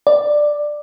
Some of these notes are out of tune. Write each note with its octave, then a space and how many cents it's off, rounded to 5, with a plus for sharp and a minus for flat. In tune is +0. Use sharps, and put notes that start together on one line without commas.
D5 +10